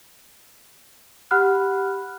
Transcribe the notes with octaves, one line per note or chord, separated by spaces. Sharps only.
G4 F#5 B5 F6 F#6